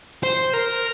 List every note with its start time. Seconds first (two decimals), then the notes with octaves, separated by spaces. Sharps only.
0.23 C5
0.53 A#4